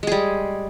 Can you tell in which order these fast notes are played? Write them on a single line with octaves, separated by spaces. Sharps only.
G#3 G#4 G3